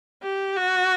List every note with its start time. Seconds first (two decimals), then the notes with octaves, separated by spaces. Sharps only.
0.22 G4
0.57 F#4